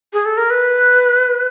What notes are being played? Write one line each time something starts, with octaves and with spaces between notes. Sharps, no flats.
G#4
A4
A#4
B4